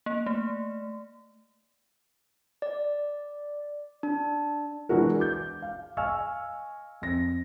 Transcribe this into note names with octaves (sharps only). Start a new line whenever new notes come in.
A#3
A3
D5
D4
E3 G#3 D4 E4 F#4 A#4
D6 G6
F5
D#5 F5 G#5 C#6 E6 F6
F2 A#6